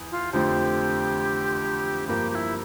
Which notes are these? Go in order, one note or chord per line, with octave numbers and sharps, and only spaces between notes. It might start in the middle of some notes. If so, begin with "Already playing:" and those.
Already playing: E2
F4
F2 D3 F3 A3 C4 G4
G2 F3 A#3 G4
G4
E4